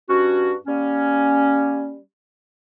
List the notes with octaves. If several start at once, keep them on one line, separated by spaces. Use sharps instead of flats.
G2 C#4 F#4
G3 A#3 C#4